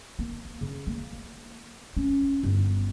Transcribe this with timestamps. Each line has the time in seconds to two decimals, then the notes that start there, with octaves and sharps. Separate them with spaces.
0.19 A#3
0.61 C#3
0.87 A#3
1.97 C#4
2.43 G1